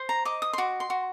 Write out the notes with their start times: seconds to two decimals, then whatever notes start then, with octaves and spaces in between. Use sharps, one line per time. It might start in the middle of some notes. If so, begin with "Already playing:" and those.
Already playing: C5
0.09 A#5
0.25 D#5 D6
0.42 D#6
0.53 C6
0.58 F#4 D6
0.80 C6
0.90 F#4